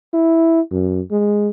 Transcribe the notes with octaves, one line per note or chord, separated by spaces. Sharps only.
E4
F#2
G#3